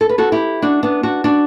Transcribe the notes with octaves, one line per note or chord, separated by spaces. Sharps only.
A4
B4
F#4 A4
E4 G4
D4 F#4
B3 D4
D4 F#4
D4 F#4